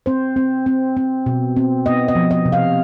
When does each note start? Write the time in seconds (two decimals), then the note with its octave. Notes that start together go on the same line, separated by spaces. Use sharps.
0.06 C4 C5
0.36 C4
0.66 C4
0.97 C4
1.26 B2
1.57 C4
1.86 B3 D#5
2.08 D#5
2.15 F3
2.31 D#5
2.45 C3
2.52 F5